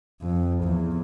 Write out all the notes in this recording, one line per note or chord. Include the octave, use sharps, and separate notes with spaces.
F2
E2